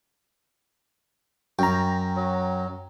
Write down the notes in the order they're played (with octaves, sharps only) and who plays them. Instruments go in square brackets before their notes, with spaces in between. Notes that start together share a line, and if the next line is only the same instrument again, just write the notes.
[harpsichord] F#2 [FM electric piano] G5 A#5
[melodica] F#3